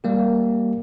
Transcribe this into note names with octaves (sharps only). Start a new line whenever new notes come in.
G3 A#3 G4